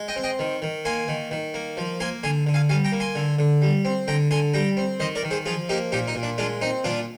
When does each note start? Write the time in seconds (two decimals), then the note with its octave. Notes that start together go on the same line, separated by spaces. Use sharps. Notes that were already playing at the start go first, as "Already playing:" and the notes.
Already playing: G#3
0.08 D#5 G5
0.16 C4
0.24 D#5 G5
0.39 D#3
0.62 D#3
0.85 A#3 G#5 C6
1.08 D#3
1.31 D#3
1.54 A#3
1.77 F3
2.00 A#3 G#5 C6
2.23 D3 G#5 C6
2.47 D3
2.54 F5 G#5
2.69 G3 F5 G#5
2.85 G5 A#5
2.92 A#3
3.00 G#5 C6
3.15 D3
3.39 D3
3.62 G3
3.85 C4
4.08 D3 G5 A#5
4.31 D3 G#5 C6
4.54 G3 G5 A#5
4.77 C4
5.00 D#3 C5 D#5
5.15 A#4 D5
5.23 D#3
5.31 G#4 C5
5.46 F3 F4 G#4
5.69 A#3 D#4 G4
5.92 A#2 D#4 G4
6.07 D#4
6.15 A#2
6.23 D4
6.38 G#3 D4 F4
6.61 C4 D#4
6.84 A#2 D4 F4